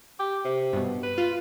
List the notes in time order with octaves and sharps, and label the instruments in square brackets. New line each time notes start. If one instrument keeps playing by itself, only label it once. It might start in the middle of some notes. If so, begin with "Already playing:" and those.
[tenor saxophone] G4
C3
[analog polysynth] G2 B2
[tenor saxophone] B4
[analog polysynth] F4